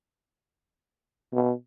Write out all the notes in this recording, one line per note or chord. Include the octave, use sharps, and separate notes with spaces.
B2